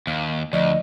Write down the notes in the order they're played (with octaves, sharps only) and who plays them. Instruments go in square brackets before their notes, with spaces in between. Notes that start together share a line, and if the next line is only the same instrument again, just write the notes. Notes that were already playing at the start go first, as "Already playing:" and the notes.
[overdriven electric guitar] D#2 [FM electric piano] F5
[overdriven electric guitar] D2 [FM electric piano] F3 D5 C#6 [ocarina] D#5